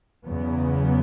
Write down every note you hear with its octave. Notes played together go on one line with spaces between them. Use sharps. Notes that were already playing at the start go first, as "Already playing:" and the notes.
E2 C#3 F#3 B3